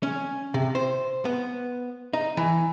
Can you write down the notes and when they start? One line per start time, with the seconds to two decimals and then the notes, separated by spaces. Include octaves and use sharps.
0.03 C#4
0.54 C3
0.75 C5
1.25 B3
2.13 D#4
2.37 E3